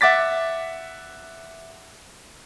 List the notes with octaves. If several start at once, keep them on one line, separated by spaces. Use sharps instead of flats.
E5 F#5 D6 A6 B6